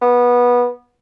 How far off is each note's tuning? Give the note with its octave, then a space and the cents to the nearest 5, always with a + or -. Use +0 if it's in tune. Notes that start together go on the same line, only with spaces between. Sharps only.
B3 -20